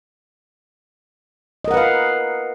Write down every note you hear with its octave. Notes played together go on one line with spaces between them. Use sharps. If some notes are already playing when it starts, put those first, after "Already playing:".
A#4 B4 D#5 F5 F#5